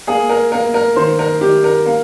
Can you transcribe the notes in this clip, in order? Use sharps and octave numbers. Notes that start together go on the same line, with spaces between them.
A#3 G#4
A#4
A#3 A#4
A#4
D#3 C5
A#4
D#3 G4
A#4
A#3